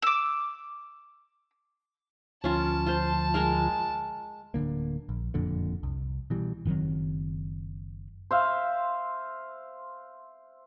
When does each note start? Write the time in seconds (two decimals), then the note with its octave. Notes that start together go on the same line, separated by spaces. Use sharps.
0.02 D6 E6
2.44 D2 F3 C#4 F4 A#4 A5
2.87 F4 C5
3.34 G#3 A#4 F5
4.54 D1 F#2 D3 A#3
5.09 A#1
5.34 F#1 F2 A#2 D3
5.83 C2
6.30 B2 E3 G3
6.65 F#1 D#3 F#3 C4
8.31 C5 E5 F5